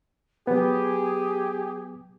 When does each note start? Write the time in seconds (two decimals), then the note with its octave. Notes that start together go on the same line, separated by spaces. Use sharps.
0.47 F#3 B3 G4 G#4